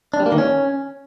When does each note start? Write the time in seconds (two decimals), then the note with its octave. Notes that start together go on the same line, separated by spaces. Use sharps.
0.14 D4
0.20 G3
0.26 A#3
0.32 D#3
0.38 C#4